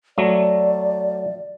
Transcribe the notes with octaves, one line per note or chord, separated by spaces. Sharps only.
F#3 A3 D5